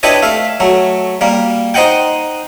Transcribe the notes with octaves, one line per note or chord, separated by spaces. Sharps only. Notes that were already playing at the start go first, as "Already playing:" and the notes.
D4 E4 G4 B4 C#5 D#5
A3 E5 F5
F#3 A3
G3 A#3
D#4 C5 D#5 F#5 G5